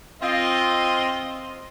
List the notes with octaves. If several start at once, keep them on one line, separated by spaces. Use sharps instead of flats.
C4 F4 D#5